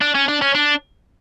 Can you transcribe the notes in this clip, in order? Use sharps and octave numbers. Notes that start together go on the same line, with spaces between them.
D4
C#4
D4
C#4
D4